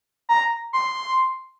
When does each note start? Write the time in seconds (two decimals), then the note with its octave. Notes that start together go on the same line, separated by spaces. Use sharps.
0.29 A#5
0.73 C6